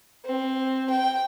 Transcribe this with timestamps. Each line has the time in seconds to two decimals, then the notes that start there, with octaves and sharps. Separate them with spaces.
0.25 C4
0.90 G5